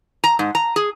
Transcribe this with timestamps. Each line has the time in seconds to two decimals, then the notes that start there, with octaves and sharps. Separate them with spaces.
0.24 A#5
0.39 G#2
0.55 A#5
0.76 G#4